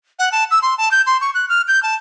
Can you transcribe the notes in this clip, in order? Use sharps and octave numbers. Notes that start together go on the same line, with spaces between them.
F#5
A5
E6
C6
A5
G6
C6
C#6
F#6
F6
G6
A5